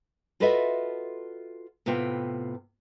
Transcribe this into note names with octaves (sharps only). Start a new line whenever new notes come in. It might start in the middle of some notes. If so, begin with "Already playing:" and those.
F4 F#4 A4 B4 D#5 E5
A2 C3 B3 F4 G5